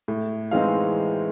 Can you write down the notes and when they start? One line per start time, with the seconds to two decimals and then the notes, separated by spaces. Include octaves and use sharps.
0.08 A2
0.51 E3 G#3 C4 D#4 F5